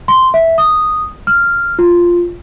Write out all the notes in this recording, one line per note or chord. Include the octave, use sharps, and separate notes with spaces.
C6
E5
D#6
F6
F4